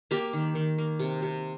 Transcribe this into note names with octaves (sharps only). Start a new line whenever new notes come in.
A#3 G4
D#3
D#3
A#3
C3
C3